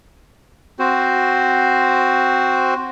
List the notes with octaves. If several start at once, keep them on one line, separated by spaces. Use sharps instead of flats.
C4 F#4 C5